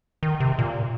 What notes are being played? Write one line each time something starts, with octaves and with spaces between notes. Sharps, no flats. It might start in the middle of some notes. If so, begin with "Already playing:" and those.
D#3
C3
A#2